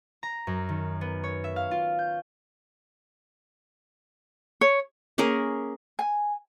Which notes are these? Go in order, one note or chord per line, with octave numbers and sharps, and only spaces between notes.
A#5
F#2
D#3
B3
C#5
E5
F5
F4
G6
C#5
A#3 C#4 G#4 A#4
G#5